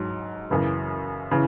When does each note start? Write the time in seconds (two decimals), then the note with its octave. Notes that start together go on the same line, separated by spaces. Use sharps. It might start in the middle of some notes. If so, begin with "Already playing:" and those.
Already playing: G#2 F#3
0.50 F#2 C#3 E3
1.31 C#3 E3